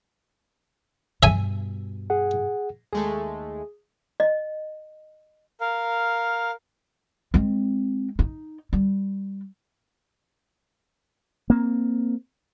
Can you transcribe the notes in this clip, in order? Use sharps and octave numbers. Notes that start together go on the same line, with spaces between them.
G2 B2 E5 G#5
G#4 F#5
D#2 G#3 A3 G#4
D#5
A#4 F5
G#3 C4
D#4
G3
A#3 C4